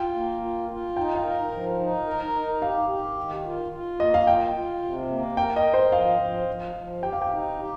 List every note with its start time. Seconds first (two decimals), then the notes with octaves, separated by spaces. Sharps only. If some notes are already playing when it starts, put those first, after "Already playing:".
Already playing: F4 G5
0.14 A#3
0.42 F4
0.69 F4
0.97 D#4 G5
1.15 F5
1.25 A#4
1.52 F3
1.79 D#4
2.07 A#4
2.35 D#4
2.62 G4 F5
2.90 G4
3.17 D#3
3.45 F4
3.72 F4
4.00 A#3 D#5
4.14 F5
4.27 F4 G5
4.55 F4
4.82 C3
5.10 A#3
5.37 A#4 G5
5.56 D#5
5.65 A#4
5.74 C5
5.92 F3 F5
6.20 F3
6.48 F3
6.75 F3
7.02 G4 G5
7.13 F5
7.22 G5
7.30 D#4
7.57 G4